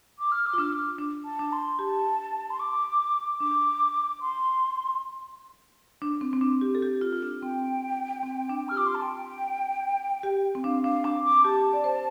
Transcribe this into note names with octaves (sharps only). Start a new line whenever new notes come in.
D6
F6
D6
F4
D4 F6
D6
D4
A5
D4
C6
G4 A5
C6
D6
D4 D6
C6
D4
C4
C4
D4
G4
A4
G4
F4
F4
D4
C4 G5
C4
D4
G4 F6
F4 D6
C6
A5
G5
G4
C4
D4 F5
D4 F5
D4 D6
D6
G4 A5
D5
C5